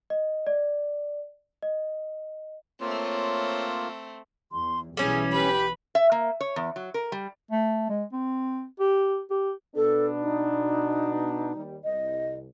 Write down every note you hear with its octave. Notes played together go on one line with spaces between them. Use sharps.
D#5
D5
D#5
A3 A#3 C4 F4 C#5
E2 C6
B1 E3 G3 C#4 G#4
G4 B4 B5
E5
A#3
C#5
E2
F#3
A#4
G3
A3
G#3
C4
G4
G4
B2 B3 D4 A4
D#4
D#2 G3
C2 D#5